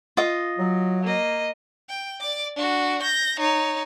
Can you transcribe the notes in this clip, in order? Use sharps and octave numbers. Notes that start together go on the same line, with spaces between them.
F4 D#5
F#3
A#3 D#5
G5
D5 D6
D4 F#4
G6 A#6
D#4 C#5